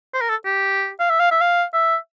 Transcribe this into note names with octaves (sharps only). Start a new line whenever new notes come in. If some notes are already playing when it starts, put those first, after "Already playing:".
C5
A#4
A4
G4
F5
E5
F5
E5
F5
E5